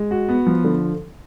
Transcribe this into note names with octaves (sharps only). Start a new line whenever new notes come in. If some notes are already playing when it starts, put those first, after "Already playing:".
Already playing: G#3
F#4
B3
F3
D3